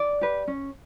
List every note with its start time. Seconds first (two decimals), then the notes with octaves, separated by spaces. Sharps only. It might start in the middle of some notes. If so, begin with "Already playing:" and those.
Already playing: D5
0.21 G4 B4
0.48 C#4